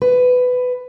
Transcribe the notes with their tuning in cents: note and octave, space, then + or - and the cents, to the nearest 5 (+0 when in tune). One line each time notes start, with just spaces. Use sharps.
B4 +15